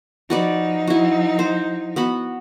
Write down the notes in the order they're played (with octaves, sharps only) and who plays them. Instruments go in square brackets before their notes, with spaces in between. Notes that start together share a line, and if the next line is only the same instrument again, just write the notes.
[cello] F3 D#4 [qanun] F#4 B4 D5
[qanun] E4 F#4
C5
B3 F#4 B5